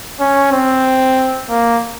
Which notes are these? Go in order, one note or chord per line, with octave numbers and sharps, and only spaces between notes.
C#4
C4
A#3